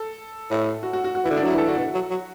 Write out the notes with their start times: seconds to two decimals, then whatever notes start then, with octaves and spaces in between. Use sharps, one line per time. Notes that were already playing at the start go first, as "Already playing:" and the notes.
Already playing: A4
0.51 A2
0.83 F#4
0.93 F#4
1.04 F#4
1.15 F#4
1.25 E3 E4
1.31 D3
1.37 D4
1.44 F#3 E4
1.56 E3 A4
1.67 D3 F#4
1.78 B2
1.95 F#3
2.11 F#3